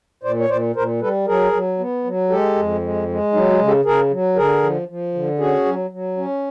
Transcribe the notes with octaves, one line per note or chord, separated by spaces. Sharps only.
A#2 C5 D5
C#5
A#2 C5 D5
A#2 A#4 C5
G3 A4 B4
F#3 G#4 A#4
F#3
B3
F#3
G#3 G4 A4
F2
G#3
G#3
F#3 D#4
F#4 G#4
C#3
G4 A4
C#3 G#4 A#4
F#3
D3 G#4 A#4
F3
F3
D3
C#4 F#4 G#4
F#3
F#3
C#4